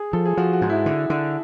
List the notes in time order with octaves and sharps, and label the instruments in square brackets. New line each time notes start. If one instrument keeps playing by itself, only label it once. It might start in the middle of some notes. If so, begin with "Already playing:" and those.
Already playing: [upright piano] G#4
[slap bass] F3 [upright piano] A4
[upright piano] G#4
[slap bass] F3 [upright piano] F#4
[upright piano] F#4
[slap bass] G#2
[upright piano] E4
[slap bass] D3
D3